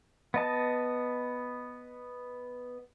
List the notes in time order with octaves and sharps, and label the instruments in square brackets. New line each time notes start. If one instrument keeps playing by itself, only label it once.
[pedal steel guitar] B3 D#5 A5